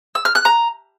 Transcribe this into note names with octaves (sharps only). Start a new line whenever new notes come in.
E6
F6
F#6
A#5